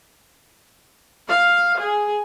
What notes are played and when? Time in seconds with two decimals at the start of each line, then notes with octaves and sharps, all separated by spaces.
1.29 F5
1.77 G#4